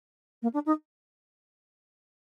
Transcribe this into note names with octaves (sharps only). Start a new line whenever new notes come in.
A#3
D4
D#4